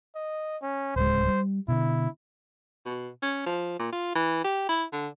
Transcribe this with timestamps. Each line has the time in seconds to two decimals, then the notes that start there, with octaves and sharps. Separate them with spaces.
0.15 D#5
0.62 C#4
0.96 D1 C#2 G#3 C5
1.27 G3
1.68 B2 D3 E4
2.85 B2
3.22 C#4
3.46 F3
3.79 A#2
3.93 F4
4.15 E3
4.44 G4
4.69 E4
4.93 D3